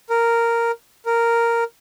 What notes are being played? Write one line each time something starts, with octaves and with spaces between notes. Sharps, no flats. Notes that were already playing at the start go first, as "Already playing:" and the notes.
A#4
A#4